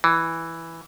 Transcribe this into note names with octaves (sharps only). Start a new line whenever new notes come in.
E3